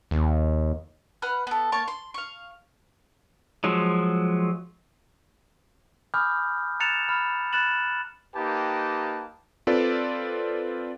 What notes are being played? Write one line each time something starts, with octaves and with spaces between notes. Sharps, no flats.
D#2
B4 F#5 B5 F6
B3 A4
A#3 C#5 A5 C#6
C6
F5 C#6
F3 F#3 G#3
G#5 B5 D6 D#6 F6 G6
A#5 F#6 A6 C#7 E7 F7
B5 F6
B5 F#6 A6 E7 F#7
A#3 D#4 G4 B4 G5 A5
C4 F4 A4 B4 D5